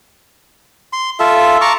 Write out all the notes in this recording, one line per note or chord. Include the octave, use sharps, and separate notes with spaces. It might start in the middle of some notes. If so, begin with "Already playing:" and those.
C6
F4 A4 E5
A5 A#5 C#6 D6